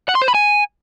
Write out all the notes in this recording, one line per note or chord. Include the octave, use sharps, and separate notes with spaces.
F#5
C6
C5
B5
G#5